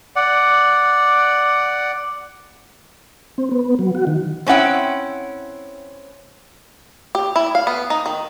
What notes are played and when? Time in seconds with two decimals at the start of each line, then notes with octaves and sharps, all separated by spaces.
0.16 D5 F#5
3.38 C4
3.51 B3
3.79 F#3
3.95 F#4
4.07 D#3
4.47 C4 C#4 E4 F#5 G5
7.15 G4
7.36 E4
7.55 F5
7.67 B3
7.90 D#4
8.06 D#3